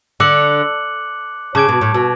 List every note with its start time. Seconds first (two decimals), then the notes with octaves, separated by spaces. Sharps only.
0.20 D3 D6 F#6 C#7 F#7
1.55 C#3 A5 D6 G#6 D7
1.69 B2
1.81 A2
1.94 B2